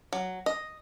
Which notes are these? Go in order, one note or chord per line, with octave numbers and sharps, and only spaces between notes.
F#3
D#5